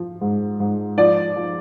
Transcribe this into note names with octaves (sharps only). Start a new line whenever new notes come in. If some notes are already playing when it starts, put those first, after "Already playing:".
Already playing: F3
G#2
G#2
F3 D5
F3